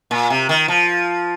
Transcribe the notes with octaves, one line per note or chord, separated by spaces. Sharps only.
A#2
C3
D#3
F3